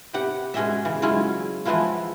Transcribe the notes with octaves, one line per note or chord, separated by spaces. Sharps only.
C3 B3 G4 F#5
B2 G#3 C#4 G#4 D#5 E5
C#3 E3
F#3 G#3 C#4 E4 F4
E3 F3 G#3 B3 E4 F4